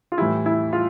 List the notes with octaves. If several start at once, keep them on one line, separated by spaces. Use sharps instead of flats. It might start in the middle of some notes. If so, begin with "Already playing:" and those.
F4
A2 E3 G3 E4
E4
F4